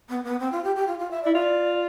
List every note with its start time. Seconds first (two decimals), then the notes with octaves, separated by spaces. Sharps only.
0.09 B3
0.24 B3
0.40 C4
0.51 F4
0.64 G4
0.75 G4
0.87 F4
0.99 F4
1.11 E5
1.23 D5
1.26 E4
1.34 F4 D5